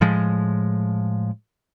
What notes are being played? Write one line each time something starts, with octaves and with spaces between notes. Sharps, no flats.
A2 F3 G#3